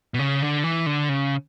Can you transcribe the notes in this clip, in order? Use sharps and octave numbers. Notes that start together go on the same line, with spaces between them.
B2
C#3
D3
E3
D3
C#3